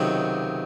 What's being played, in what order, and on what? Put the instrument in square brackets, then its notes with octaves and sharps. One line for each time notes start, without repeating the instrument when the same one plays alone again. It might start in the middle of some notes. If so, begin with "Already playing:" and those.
Already playing: [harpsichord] C#2 C3 D#3 F#3